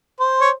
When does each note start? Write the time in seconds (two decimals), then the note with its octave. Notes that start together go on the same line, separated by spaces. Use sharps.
0.20 C5
0.41 C#5